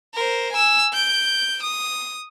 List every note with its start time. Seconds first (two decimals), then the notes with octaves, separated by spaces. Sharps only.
0.14 A#4 C5
0.53 G#5 E6
0.93 G6 D7
1.63 D#6